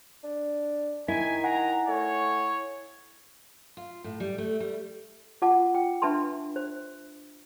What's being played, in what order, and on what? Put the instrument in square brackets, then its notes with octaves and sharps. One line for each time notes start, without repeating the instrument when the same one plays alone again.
[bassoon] D4
[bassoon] D#3 [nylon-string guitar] E4 [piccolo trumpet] G#5 [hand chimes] B6
[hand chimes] F#5 G#5 [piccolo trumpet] A#5
[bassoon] A3 [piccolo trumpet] C#5
[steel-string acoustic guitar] F4
A2
G3
A3
G3
[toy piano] F4 F#5 A5 D6
G5
D4 B4 E5 A5 B5 C6
C5